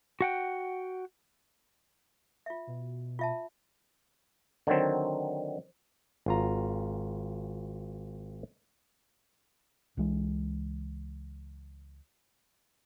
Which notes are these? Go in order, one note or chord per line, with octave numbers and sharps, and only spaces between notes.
F#4 F#5 G5
F4 E5
B2
F4 E5 A5
D3 D#3 F#3 C4
G#1 F4 A#5
C#2 E3 G#3